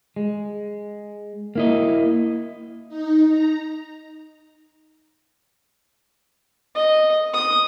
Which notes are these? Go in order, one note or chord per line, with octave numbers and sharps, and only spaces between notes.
G#3
A#3 E4 D#5
D#4
A#5
D#5
D#6